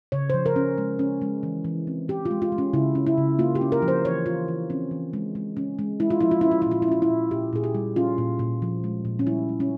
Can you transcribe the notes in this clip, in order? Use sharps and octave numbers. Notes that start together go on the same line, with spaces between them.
C#3 C#5
F3 C5
A#4
C#4
G#3
C#4
G#3
E3
E3
C4
E3 G4
F4
G#3
F4
G#3
C#4
C#3 E4
C#4
E4
C#3
A#3 F4
G4
C#4
A#4
F3
C5
E3 C#5
E3 F4
E3
C4 C#4
E3
G#3
G#3
C#4
G#3
G#3 E4
F4
F3 E4
F4
C#4 E4
F4
A#2 E4
F4
E4
C#4 F4
E4
A#2
A#2 G4
A#2 G#4
G4
G3
C#4 F4
A#2
A#2
F3
G#3
A#2
C#4
G3 E4
G3
C#4